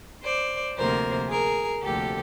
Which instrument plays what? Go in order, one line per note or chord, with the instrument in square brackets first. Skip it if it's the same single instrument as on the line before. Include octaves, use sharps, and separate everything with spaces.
[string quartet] C5 D5
D2 C3 F3 A#3 A#4 C5
G#4 A#4
D2 C3 F3 A#3 G4 A4